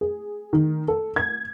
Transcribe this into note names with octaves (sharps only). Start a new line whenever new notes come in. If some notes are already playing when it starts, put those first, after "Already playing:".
G#4
D#3
A4
G#6